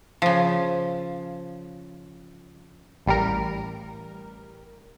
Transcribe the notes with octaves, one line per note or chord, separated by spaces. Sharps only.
C#3 F3
A1 G3 A#4